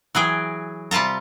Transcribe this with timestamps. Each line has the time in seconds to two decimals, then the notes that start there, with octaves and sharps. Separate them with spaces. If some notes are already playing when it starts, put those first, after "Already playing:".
0.15 E3 F#3 G#4 G5
0.91 C3 G3 F4 A5 A#5